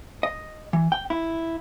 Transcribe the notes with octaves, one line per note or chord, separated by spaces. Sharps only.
D#5
E3
G5
E4